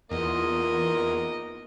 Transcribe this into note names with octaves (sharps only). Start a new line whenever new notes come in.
E2 A#3 D#4 F4 A#4 D#5